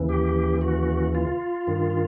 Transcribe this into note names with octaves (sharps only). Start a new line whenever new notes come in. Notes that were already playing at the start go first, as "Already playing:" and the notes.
Already playing: D#2 C#3 E3
G4
F#4
F4
G2 D#3